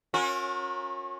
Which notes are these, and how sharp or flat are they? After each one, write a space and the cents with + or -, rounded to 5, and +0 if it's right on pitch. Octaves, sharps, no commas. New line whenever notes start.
C#4 -20 F#4 -45 A#4 +0